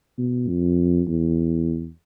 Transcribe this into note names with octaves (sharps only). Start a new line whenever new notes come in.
B2
F2
E2